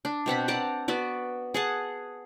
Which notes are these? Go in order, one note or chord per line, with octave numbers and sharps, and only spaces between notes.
D4
B2 C4 F#5 B5
D5 F#5 A5 A#5
B3 F#4 D5
G#4 F#5 A5